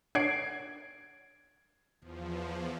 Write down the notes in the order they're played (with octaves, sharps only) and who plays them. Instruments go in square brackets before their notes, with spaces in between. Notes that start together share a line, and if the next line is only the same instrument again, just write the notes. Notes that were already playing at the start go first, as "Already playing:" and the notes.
[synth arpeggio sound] D4 C#5 F#5 [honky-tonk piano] G#6 C7 D7
[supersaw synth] E2 F3